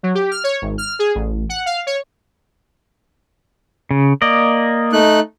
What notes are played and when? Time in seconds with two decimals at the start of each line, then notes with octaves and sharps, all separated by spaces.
0.03 F#3
0.15 G4
0.31 F6
0.44 C#5
0.62 G#1
0.78 F6
0.99 G#4
1.15 A1
1.49 F#5
1.66 F5
1.87 C#5
3.91 C#3
4.22 A#3 D5 D#5
4.93 A3 D#4 F#6